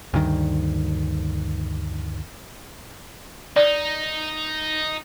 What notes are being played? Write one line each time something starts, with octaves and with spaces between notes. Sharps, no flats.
D2 G2 D#3
D#4 D5